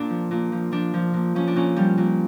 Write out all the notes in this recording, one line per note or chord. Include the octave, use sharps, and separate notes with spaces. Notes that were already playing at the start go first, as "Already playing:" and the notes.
Already playing: A#2 D4
F3
A#2
F3
F3 D4
F3
A#2
F3 C#4
D4
A#2 C#4
F3 G3
A#2